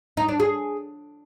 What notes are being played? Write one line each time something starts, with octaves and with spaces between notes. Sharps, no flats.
D#4
D4
G#4